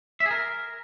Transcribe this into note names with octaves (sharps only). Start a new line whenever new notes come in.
E5
G#4
A#4